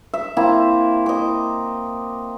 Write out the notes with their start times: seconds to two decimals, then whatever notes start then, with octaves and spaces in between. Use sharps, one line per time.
0.14 E5
0.37 A#3 C4 E4
1.06 D#5 D6